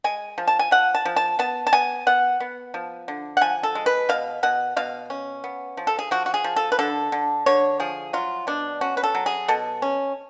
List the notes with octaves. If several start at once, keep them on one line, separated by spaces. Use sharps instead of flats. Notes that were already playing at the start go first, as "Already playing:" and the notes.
G#3 G#5
F3
A5
G#5
F3 F#5
A5
F3
A5
B3 A5
A5
B3 G#5
B3 F#5
B3
F3
D3
F#5
F3 G#5
A4
G#3
B4
B2 F5
B2 F#5
B2 F5
C#4
B3
F3
A4
G#4
F3 F#4
F#4
G#4
F3
A4
B4
D3 A4
D3
D3 C#5
F3 G#4
F#3 F4
B2 D4
C#4 F#4
B4
A4
F#3
G#4
B2 A4
C#4